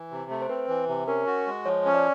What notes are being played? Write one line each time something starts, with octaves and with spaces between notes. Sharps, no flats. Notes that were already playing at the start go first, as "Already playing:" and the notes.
Already playing: E3
C3
A3
C5
C4 B4
E3
C3
C#4 A#4
F#4
G#3
F3 C#5
C#4
D5